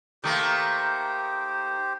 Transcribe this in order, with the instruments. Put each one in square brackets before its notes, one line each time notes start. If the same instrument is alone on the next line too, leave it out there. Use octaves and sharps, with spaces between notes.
[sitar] D#3 A3 A#3 [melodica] G4 C5